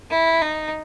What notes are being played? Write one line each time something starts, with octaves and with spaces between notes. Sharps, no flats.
E4
D#4